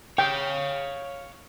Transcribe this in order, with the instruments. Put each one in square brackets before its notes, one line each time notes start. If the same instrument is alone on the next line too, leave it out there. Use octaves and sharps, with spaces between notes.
[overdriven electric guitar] C#5 F5 [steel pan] G5